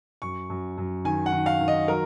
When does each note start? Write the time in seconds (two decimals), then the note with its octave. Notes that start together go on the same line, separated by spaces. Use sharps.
0.22 F#2 C#6
0.50 F#2
0.78 F#2
1.05 D#3 G#5
1.26 F#5
1.33 D#3
1.46 F5
1.61 D#3
1.68 D#5
1.88 F#3 A#4